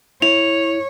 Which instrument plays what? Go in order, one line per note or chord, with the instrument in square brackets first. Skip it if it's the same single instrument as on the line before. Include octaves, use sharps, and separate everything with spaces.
[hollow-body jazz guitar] E4 [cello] C#5 [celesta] F7